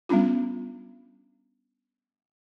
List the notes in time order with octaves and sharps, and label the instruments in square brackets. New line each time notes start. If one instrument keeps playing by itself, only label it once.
[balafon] G3 B3 C#4 D4 F4